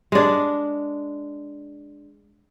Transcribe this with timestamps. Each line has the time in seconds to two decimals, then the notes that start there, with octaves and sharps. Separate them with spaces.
0.12 G#3 D4